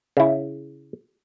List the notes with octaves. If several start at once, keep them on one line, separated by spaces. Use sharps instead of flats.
C#3 E4